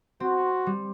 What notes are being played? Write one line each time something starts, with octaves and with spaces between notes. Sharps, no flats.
C4 F#4
G3